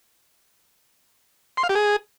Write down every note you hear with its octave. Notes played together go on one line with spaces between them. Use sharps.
C6
F5
G4
G#4